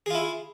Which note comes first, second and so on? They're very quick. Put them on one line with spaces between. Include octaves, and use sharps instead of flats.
G#4 F4 E4